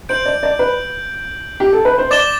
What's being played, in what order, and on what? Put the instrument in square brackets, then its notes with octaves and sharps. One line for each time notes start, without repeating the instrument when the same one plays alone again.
[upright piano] C5 [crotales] G6 D7 F#7
[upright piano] D5
D5
B4
G4
A4
B4
C5
[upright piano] D5 [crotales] D6 A6 E7 G7